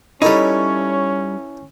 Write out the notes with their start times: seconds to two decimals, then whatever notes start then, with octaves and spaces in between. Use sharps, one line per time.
0.22 G3 C#4 D#4 E4 A4 B4 C#5